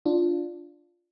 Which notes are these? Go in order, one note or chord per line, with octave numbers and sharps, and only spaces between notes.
D4 F4